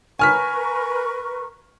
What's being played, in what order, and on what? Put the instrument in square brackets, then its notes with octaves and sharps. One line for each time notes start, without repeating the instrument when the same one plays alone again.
[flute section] A#4 B4 C#6 [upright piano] G#5 F6 B6